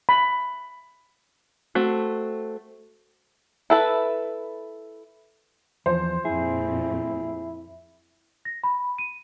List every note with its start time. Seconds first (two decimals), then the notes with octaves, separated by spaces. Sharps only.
0.09 B5
1.75 A3 C4 F#4
3.70 E4 A4 B4
5.86 E2 F3 C5
6.25 F2 A#2 C4 E4 G#4
8.45 A#6
8.64 B5
8.98 D#7